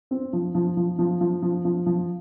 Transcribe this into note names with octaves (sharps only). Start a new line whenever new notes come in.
C4
F3
F3
F3
F3
F3
F3
F3
F3